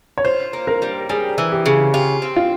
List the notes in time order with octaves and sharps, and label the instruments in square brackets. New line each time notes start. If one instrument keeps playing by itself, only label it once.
[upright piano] C#5
[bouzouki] F4 [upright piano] C5
[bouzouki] A#3
[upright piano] A#4
[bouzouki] G3
[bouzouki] G3 [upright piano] G#4
[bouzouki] E3
[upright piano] G4
[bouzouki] C#3
[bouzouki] F4 [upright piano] G4
[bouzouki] C4
[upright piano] F4